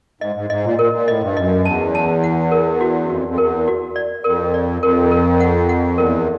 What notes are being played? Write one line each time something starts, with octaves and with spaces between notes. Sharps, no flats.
G#2 D#5
G#2
G#2 D#5
A#2
A#2 A#4
A#2
A2 D#5
G2
F#2 D#5
E2 A5
A5
F#5
A#4
F#4
F#2
F2 F#4
F2
E2 A#4
F#4
D5
F2 A#4
D5
F2 A#4
A#4
F#5
F#5
E2 A#4